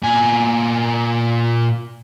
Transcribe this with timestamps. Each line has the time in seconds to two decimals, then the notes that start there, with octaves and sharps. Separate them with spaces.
0.04 A#2 G#5